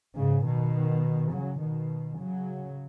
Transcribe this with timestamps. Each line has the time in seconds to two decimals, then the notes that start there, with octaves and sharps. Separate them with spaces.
0.15 G#2 C#3
0.45 B2 D#3
1.32 C#3 F#3
1.60 B2 D#3
2.18 C#3 F#3